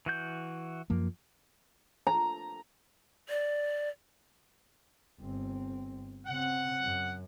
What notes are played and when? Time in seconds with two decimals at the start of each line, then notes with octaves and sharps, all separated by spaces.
0.06 E3 F#4 G6
0.90 F#2 F3 A#3
2.07 A#5
3.29 D5
5.20 G1 C4
6.27 C#3 C4 F#5
6.81 F#2